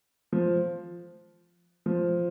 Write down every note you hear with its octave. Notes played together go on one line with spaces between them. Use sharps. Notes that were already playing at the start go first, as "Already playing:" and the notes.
F3
F3